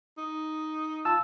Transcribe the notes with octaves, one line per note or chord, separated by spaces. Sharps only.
D#4
F4 A5 E6